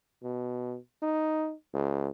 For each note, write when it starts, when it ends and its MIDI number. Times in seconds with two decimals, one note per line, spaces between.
0.23 0.77 47
1.02 1.53 63
1.74 2.11 37